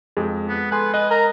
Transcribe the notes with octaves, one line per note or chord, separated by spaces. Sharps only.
F2 G#3
B3
A4 B4 G#5 C6
B4 D#5 G#5
A#4 A#5